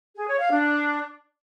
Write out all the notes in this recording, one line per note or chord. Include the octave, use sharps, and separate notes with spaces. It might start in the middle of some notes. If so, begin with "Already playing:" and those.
G#4
C#5
F5
D4